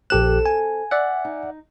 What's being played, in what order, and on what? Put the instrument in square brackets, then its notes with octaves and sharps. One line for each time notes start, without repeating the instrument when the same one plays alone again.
[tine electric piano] A#1 G4 F#6 [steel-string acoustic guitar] C4 A4 [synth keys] E7
[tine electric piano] G#5
[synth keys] D5 E5 F#5
[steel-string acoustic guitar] D#4